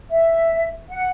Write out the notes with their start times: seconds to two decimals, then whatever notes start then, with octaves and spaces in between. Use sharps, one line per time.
0.11 E5
0.90 F#5